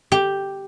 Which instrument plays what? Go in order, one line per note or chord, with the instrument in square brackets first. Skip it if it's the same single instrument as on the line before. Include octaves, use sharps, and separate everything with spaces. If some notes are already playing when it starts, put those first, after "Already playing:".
[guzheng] G4